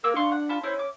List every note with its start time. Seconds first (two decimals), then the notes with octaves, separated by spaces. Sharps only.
0.04 A#3 A#4 E6
0.16 D4 F5 C6 C#6
0.32 F#5
0.49 F4 A5 B5
0.63 E4 C5 C#5
0.79 D6